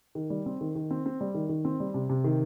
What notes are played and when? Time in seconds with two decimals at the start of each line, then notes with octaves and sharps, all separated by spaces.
0.15 D#3
0.30 G3
0.46 C4
0.61 D#3
0.75 D#3
0.91 C4
1.06 C4
1.21 G3
1.35 D#3
1.49 D#3
1.65 C4
1.80 G3
1.94 C3
2.10 C3
2.24 D#3